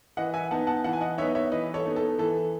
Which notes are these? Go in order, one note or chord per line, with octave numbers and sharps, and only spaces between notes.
E3 D#5 F#5
E5 G#5
B3 D#4 F#5 A5
F#5 A5
E3 F#5 A5
G#5
D#5 F#5
B3 D#4 C#5 E5
C#5 E5
E3 B4 D#5
A4 C#5
B3 D#4
A4
E3 A4